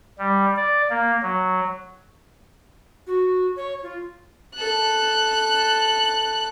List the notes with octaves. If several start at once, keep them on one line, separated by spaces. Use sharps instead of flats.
G3
D5
A#3
F#3
F#4
C#5
F4
A4 F#6